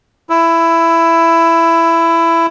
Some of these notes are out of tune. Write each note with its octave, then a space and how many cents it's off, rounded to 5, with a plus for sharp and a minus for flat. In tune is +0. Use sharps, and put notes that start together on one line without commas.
E4 +15 E6 +0